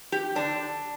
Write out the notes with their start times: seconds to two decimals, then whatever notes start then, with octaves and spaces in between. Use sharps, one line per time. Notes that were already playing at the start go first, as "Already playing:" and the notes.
0.12 G4
0.35 D3 D4